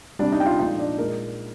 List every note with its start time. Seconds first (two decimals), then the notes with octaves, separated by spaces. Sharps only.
0.19 C3 G3 D4 D5
0.32 D#4 D#5
0.40 G5
0.46 F4 F5
0.59 A#2 F3 G#3 D#4 D#5
0.79 D4 D5
0.99 A#2 G#3 A#3 A#4